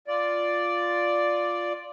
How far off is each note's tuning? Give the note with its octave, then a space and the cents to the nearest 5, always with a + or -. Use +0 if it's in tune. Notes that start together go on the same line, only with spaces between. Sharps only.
F4 +0 D5 +0